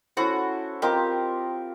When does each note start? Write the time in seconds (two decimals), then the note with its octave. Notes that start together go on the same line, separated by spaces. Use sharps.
0.17 C#4 E4 F#4 A4 C5
0.82 C4 F4 G4 A#4 D#5